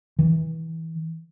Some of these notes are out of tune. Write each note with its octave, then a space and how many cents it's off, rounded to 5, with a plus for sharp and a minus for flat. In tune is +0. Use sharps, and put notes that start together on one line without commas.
E3 -25